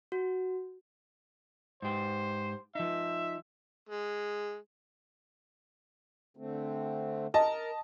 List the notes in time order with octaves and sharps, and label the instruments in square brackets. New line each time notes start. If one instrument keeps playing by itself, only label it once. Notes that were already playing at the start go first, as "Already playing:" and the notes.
[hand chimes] F#4
[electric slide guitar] G#2 G4 [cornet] C5
[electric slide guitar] F3 D#4 [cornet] E5
[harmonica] G#3
[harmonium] D3 A3 C4
[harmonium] A#4 [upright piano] D#5 A5